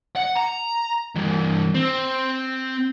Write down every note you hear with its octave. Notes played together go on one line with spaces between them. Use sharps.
F#5
A#5
G2 E3
C4